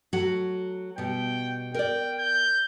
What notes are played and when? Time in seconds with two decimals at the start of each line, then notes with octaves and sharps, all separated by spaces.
0.13 F#3 A3 F#4
0.98 B2 G3 G5
1.74 A#4 D5 G5
2.19 G6